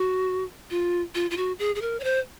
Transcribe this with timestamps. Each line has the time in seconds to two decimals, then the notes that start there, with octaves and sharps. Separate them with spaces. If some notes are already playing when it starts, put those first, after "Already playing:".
Already playing: F#4
0.70 F4
1.15 F4
1.31 F4
1.37 F#4
1.59 G#4
1.75 G#4
1.81 A#4
2.00 C#5
2.04 C5